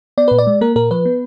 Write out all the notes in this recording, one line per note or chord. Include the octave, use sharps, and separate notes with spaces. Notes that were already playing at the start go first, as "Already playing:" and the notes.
B3 D5
A#2 B4
D5
G#3
A#3 A#4
A#2 A#4
F3 B4
B3